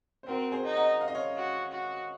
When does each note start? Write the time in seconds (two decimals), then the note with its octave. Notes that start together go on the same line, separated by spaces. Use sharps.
0.23 C5
0.27 C4 F#4 A#4
0.52 G#4 C5
0.64 D#4
0.76 D#5 F#5
1.01 F5
1.08 D#5
1.15 C#5 F5
1.36 F#4
1.72 F#4